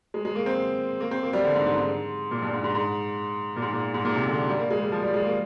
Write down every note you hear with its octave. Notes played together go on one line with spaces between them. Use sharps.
G#3
G#3
A#3
C4
A#3
C4
A#3
G3
D3
G#2
G#2
G#2
A#2
G2
G#2
G#2
G#2
A#2
G#2
A#2
G#2
A#2
C3
D3
G3
A#3
G#3
G3
F3
G3
G#3
A#3